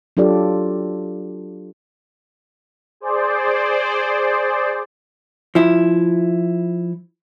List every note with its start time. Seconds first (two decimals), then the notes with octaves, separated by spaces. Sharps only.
0.17 F#3 D4 F4 G4 A4 D5
3.00 G#4 C5 D5
5.55 F3 E4